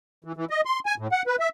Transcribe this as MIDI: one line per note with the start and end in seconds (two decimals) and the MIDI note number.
0.25 0.32 52
0.37 0.45 52
0.50 0.61 75
0.65 0.79 84
0.86 0.95 80
0.98 1.07 45
1.12 1.22 78
1.27 1.36 71
1.40 1.49 76